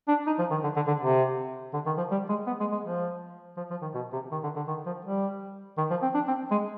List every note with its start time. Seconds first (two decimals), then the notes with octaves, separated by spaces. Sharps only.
0.08 D4
0.27 D#4
0.39 F3
0.51 D#3
0.64 D3
0.76 D3
0.87 D3
1.01 C3
1.74 D3
1.86 D#3
1.98 F3
2.11 G3
2.29 G#3
2.47 B3
2.60 G#3
2.72 G#3
2.85 F3
3.57 F3
3.71 F3
3.82 D#3
3.94 B2
4.13 C3
4.32 D#3
4.43 D3
4.56 D3
4.67 D#3
4.86 F3
5.05 G3
5.78 D#3
5.90 F3
6.02 C4
6.14 D4
6.28 C4
6.51 G#3